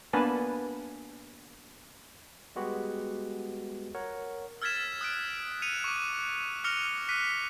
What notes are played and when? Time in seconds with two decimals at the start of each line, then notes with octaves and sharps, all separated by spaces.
0.13 A#3 B3 D4 B4 G#5 A5
2.55 G3 G#3 B3 F#4 G4 B4
3.95 A#4 C#5 F#5
4.62 E6 F6 G#6 A6 B6 E7
5.01 D#6 F#6 B6 D7
5.62 F#6 C#7 D#7 F7
5.84 C#6 D6
6.64 D6 F6 A#6 C#7 F7 G7
7.08 D6 F#6 B6 D#7